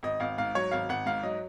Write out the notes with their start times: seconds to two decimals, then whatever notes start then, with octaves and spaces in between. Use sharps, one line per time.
0.03 G#1 D#5
0.20 G#1 F5
0.38 G#2 F5
0.55 F#3 C#5
0.71 G#1 F5
0.89 G#1 F#5
1.06 G#2 F5
1.23 F#3 D#5